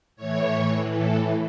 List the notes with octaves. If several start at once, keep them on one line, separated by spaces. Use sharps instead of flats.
A2 E3 C#5
A4